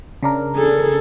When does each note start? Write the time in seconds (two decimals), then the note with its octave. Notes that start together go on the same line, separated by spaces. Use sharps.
0.23 C#3 D4 A#4
0.56 G#4 A4